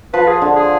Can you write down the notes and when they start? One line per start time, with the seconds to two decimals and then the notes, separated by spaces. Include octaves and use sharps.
0.13 F3 B4
0.27 G#4
0.42 D3
0.56 G#4